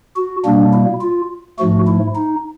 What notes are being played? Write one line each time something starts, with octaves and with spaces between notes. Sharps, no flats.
F#4
B2 G3 A#3 D4
E4
F4
G#2 F3 A3 F#4
E4
D#4